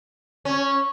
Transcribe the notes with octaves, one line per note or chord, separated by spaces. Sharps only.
C#4